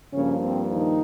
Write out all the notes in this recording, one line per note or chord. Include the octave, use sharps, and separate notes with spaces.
G2 C#3 F3 A#3 C#4
C4
D#3 D#4